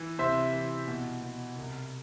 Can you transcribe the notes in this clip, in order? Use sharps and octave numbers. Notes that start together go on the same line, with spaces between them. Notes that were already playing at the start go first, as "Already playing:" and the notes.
Already playing: E3
C3 C5 E5
E3
B2
B2
C2